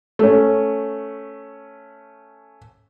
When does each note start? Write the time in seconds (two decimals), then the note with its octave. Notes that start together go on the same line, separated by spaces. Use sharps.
0.19 A3 C#4